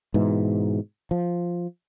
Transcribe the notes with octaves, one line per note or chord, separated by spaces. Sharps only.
G#2 B2 E3
F3